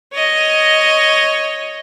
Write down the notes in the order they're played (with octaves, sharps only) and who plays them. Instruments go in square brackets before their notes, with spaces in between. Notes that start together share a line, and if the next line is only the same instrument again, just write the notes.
[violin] C#5 D#5